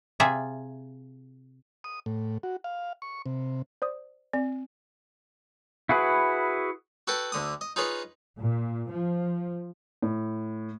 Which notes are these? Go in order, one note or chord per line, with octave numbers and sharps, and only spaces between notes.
C3 F4 G#4 E5
D#6
A2
F#4
F5
C#6
C3
C5 D5 D#6
C4 D5
E4 F#4 G#4 B4
F#4 A4 B4 G5 A5
D2 D3 D#6
D#5
D#4 F4 G#4 B4 C#5
A#2
F3
A2